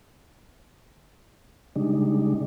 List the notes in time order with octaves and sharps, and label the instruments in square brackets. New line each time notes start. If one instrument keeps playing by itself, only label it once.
[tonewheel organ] C#3 G3 G#3 D4 D#4